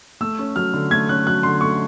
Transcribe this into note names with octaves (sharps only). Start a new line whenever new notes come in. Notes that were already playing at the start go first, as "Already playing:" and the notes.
A3 E6
C#4
F#3 F6
D3
A3 G#6
C#4 F#6
F#3 F#6
D3 C6
A3 C#6